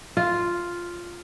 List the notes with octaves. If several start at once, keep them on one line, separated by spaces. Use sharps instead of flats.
F4